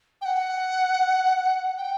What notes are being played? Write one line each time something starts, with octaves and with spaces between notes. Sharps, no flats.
G5
F#5
G5